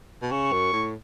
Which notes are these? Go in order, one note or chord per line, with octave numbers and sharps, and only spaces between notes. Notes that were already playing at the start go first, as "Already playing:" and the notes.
B2
C#3 C#6
F#2
A2